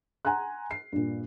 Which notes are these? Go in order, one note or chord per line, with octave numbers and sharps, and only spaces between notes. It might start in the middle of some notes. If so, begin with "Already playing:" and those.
F#5 G#5 A#5 C6 F#6
C7
G2 A#2